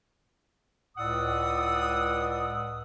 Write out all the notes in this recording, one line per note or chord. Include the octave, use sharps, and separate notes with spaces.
C#2 A2 D5 F#5 D#6 E6